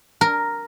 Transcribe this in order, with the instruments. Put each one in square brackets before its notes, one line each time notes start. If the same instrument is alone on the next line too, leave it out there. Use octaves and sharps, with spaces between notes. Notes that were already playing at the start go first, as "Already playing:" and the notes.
[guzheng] A#4